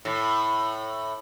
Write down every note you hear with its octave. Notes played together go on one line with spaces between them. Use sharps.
A2